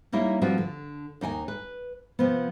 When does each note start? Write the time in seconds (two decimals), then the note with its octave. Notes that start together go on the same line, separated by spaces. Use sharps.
0.12 G3 A#3 D#4 E4 C#5
0.41 G2 F3 G3 C4 F#4
0.58 D3
1.21 D#2 D#4 G5 G#5
1.48 B4
2.19 C3 F3 B3